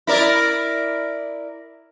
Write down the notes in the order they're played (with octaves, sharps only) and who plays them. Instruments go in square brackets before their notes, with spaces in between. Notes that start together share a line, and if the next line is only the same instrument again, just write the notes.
[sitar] E4 A#4 D5